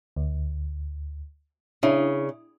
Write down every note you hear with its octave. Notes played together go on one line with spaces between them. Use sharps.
D2
C#3 D4 E4